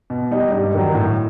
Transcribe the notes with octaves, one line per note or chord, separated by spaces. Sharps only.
B2
G3 D#4
G2
D#3 F#3
A2